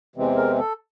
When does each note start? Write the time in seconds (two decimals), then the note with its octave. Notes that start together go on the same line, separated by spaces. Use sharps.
0.16 E2 C3 E3 G#3 C4
0.37 A#4
0.58 A4